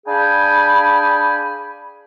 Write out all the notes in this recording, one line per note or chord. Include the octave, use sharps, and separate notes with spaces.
D4 G#4 F5 G5 G#5 B5